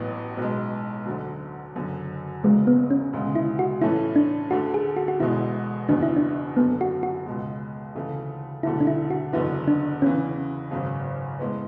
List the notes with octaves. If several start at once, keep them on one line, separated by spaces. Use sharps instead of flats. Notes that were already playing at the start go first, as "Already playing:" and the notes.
Already playing: A1 A2 F#3 B3
B1 B2 G#3
D2 D3 F#3
F#1 F#2 D3 F#3
F#1 E2 C#3 F#3 G#3
B3
C#4
E1 D2 C#3 G#3
E4
F#4
A2 E3 A3 C#4 E4
D4
D2 D3 A3 F#4
G#4
F#4
F#4
E1 E2 B2 G#3 E4
F#1 E2 B2 D4
E4
D4
F#2 D3 A3 B3
F#4
F#4
C#2 B2 G#3
D2 C#3 E3 A3
E1 D2 D3 F#3 A3 E4
D4
E4
F#4
F#1 E2 D3 F#3 B3 E4
D4
E2 C#3 E3 C#4
G#1 F#2 C#3
A2 G#3 B3